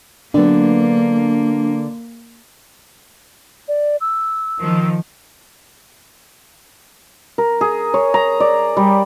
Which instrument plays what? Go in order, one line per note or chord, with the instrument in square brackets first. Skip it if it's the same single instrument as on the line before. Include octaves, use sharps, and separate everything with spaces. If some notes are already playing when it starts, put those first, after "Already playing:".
[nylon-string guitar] D3 B3 [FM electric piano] F#3 D4 [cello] A#3
[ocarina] D5
E6
[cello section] D#3 F3
[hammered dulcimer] A#4
G#4
C#5
A#5
D5
G3